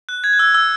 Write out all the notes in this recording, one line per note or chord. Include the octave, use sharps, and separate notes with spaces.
F#6
G#6
F#6
E6
E6